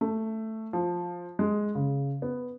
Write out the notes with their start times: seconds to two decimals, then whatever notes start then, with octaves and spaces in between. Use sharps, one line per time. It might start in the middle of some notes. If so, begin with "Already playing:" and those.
0.01 A3
0.73 F3
1.39 G#3
1.75 C#3
2.22 B3